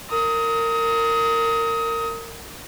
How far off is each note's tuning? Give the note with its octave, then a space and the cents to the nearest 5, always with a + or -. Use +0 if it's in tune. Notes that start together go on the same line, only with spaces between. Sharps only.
A#4 -20 D#6 +25